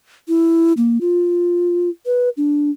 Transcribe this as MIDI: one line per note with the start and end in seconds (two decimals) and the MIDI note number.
0.28 0.73 64
0.77 0.98 58
1.01 1.89 65
2.06 2.29 71
2.37 2.71 62